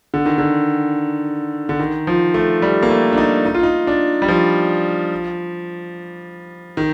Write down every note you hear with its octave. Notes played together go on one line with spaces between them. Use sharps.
D3
D#3
D3
D3
D#3
F3
A3
G3
A#3
A3
D4
D#4
D#4
F4
D#4
D4
G3
F3
D#3